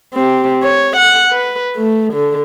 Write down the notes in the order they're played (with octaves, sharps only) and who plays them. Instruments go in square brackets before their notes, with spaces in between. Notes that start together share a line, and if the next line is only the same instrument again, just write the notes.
[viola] C4 G4
C#5
F#5
B4
A3
D3